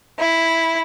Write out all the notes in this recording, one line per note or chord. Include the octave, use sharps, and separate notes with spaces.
E4